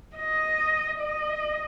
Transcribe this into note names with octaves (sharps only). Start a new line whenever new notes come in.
D#5
D#5